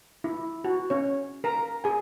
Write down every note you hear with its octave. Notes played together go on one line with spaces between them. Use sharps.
E4
F#4
C#4 C#5
A#4 A#5
G#4 G#5